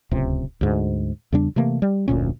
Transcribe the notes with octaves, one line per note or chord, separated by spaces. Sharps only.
D1 C#2 C3
D2 G#2
E2 C#3 G3 D4
C3 E3 A3 A#3
G3
F1 D2 A#2 C#4